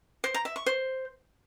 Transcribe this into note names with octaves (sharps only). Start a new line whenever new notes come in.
C5
A#5
E5
C#6
C5